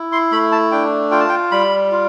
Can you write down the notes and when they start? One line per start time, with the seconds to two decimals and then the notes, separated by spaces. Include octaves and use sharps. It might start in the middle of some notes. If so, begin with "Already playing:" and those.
Already playing: E4
0.12 C6
0.31 A3 B5
0.52 A5
0.71 D4 G5
1.11 F4 G5
1.20 A5
1.29 G5
1.51 G3 B5
1.92 F4